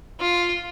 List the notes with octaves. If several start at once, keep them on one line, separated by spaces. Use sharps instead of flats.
F4